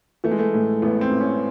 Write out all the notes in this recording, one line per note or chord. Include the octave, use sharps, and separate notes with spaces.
E3 A3
G#3
A3
A2
A1 B3
C4
A1
C#4